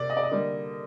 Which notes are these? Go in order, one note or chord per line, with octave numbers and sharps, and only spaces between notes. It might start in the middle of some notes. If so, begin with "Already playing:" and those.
Already playing: C3 A#3 D5
D#5
D5
D#5
D3 G3 A#3